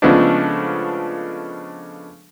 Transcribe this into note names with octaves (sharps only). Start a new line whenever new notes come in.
C#3 F3 G#3 A3 B3 D4